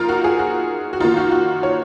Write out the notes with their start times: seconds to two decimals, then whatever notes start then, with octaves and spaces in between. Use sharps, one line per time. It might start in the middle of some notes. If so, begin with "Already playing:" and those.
Already playing: F3 A#3 D#4 F4 A#4
0.09 F#4
0.24 G#4
0.39 F#4
0.93 F#4
1.00 D#3 A#3 D#4 F4
1.17 F#4
1.31 F#4
1.63 C#5